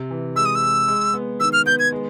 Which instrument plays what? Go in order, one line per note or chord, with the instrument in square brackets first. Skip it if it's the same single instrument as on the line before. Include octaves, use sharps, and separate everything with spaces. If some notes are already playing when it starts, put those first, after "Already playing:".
Already playing: [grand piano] C3
E3
[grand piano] G#3 [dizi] E6
[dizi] D#6
E6
[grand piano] G#3
G#3
B3
[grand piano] D#3 [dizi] E6
[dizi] F6
[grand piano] B3 [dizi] G6
[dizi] G#6
[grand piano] G#3